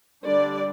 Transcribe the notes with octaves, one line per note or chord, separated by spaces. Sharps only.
D3 G3 D4 D5